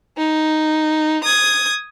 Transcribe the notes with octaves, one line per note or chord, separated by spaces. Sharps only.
D#4
D#6 G#6